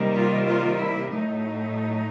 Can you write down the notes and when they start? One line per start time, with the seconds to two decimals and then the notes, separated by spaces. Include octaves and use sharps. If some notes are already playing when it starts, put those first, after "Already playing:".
Already playing: C3 D#3 G3 A#3
0.15 F4
0.47 F4
0.80 E4
1.12 A2 F#3 A3 D#4